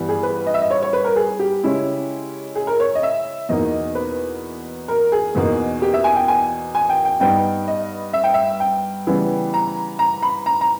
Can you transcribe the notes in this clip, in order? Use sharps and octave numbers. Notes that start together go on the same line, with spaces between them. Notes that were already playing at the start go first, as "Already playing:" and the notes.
Already playing: G2 E3 G3 B3
G#4
B4
D#5
E5
D#5
C#5
C#5
B4
A#4
G#4
G4
C#3 G#3 C#4 E4
G#4
A#4
C#5
D#5
E5
E2 B2 A#3 D#4 D#5
B4
A#4
G#4
E2 B2 A#3 D#4
G4
E5
G#5
G5
G#5
G#5
G5
G5
G2 G3 B3 D#4 G5
D#5
E5
G5
E5
G5
C#3 E3 G3 B3
A#5
A#5
B5
A#5
A#5